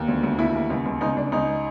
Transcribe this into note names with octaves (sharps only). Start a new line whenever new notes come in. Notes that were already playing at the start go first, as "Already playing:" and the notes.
Already playing: D#2
D2
D2
D#2 E4
D#2
C#2
C#2
C#2 D#4
C#2 D4
C#2 D#4